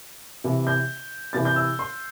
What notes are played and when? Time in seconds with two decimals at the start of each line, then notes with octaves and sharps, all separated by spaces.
0.44 C3 E3
0.67 G6
1.33 C3 E3 A6
1.45 G6
1.56 E6
1.79 C6